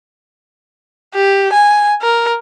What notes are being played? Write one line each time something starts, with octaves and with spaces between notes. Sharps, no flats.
G4
G#5
A#4